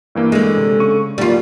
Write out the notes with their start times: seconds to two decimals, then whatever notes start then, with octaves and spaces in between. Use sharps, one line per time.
0.15 G2 E3 A#3
0.32 D3 G#3
0.57 C3
0.80 C#3 C#6 D#7
1.18 D#2 F#3 G3 A#3 F4